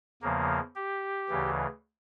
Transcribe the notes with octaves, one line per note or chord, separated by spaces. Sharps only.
E2 C#3 F3 A#3
G4
D2 C#3 E3